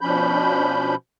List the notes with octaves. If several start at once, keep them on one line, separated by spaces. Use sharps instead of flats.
B2 F3 C#4 D4 B5 G6